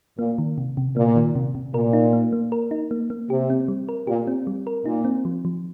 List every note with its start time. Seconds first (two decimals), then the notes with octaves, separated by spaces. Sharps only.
0.19 A#2 A#3
0.38 D#3
0.58 C3
0.77 C3
0.96 A#2 A#3
1.16 D#3
1.35 C3
1.55 C3
1.74 A#2 A#4
1.93 D#4
2.13 A#3
2.33 A#3
2.52 A#4
2.71 D#4
2.91 A#3
3.10 A#3
3.30 C3 G4
3.50 C4
3.68 G3
3.89 A#4
4.07 A#2 G4
4.27 C4
4.47 G3
4.67 A#4
4.86 A#2 D#4
5.05 C4
5.25 F3
5.45 F3